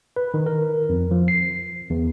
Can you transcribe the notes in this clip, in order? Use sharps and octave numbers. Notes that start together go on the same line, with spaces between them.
B4
D#3
A#4
F2
F3
C7
E2